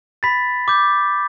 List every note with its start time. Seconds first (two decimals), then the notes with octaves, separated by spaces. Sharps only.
0.23 B5 A6 B6
0.68 D6 G6